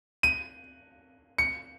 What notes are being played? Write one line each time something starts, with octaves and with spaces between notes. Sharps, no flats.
D#7
C#7